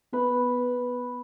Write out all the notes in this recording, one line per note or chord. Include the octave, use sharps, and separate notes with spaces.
B3 B4